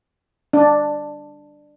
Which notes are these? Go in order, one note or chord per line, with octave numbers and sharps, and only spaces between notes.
D4